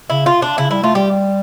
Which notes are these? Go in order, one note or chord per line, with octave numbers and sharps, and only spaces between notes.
C#3 E4
F4
D4
C#3 E4
G3 E4
A3 F4
G3 G4